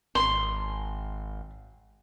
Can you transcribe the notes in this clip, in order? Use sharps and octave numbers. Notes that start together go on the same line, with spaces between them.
G#1 C6